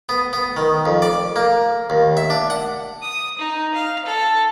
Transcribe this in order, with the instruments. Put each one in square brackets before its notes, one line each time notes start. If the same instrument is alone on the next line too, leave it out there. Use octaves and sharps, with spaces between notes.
[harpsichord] B3
B3
D#3
F2
D5
A#3
D#2
E5
D4
F#5
[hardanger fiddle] D#6
D#4
F5
A4